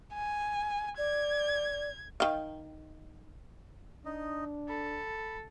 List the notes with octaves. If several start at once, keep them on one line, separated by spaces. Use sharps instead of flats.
G#5
D5 G#6
D#3 F5
D4 D#4 D#5
A4 B5